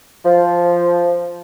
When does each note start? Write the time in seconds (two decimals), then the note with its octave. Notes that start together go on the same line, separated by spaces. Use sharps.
0.25 F3